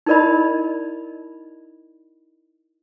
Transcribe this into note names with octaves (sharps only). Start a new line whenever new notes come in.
D#4 E4 A#4 D5 D#5 B5